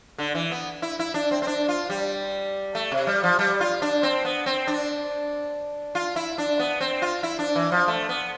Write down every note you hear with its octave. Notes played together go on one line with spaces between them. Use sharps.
D3
E3
B3
E4
E4
D4
C4
C4
D4
F4
G3
A3
C3
G3
F3
G3
F4
D4
C4
B3
C4
D4
F4
E4
D4
B3
C4
F4
E4
D4
E3
F3
A3
B3